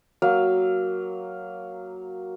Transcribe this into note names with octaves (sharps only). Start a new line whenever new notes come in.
F#3 A#3 F5 E6